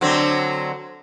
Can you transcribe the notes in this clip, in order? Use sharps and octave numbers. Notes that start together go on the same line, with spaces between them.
D3 F#3 C4